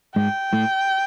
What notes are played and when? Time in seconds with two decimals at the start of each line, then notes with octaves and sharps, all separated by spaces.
0.16 G#2 G#3 G5
0.53 A2 A3